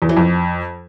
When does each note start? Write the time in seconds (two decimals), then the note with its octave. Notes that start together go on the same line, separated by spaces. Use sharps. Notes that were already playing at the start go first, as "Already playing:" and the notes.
0.02 E2
0.09 E3
0.17 F2